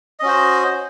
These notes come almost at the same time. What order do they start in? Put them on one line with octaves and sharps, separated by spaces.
D#5 C#4 F#4 C5